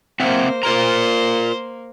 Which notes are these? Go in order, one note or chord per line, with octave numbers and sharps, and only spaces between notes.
A#3 C4 C5 E5 F#5
A#3 F4 A#4 C5 A#5